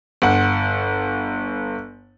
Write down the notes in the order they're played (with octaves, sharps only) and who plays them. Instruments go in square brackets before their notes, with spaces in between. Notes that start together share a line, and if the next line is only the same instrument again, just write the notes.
[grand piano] G1 F#5